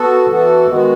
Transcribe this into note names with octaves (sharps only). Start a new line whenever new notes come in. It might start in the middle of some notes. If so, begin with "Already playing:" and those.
Already playing: B3 F#4 A4
E3 B3 F#4 A4
D#3 G#3 B3 F#4